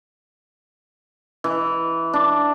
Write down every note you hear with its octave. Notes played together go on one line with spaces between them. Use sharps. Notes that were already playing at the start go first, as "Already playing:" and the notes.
E3
D4